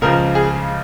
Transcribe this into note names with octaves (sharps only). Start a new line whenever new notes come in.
C#2 C#3 F3 A#4
G#4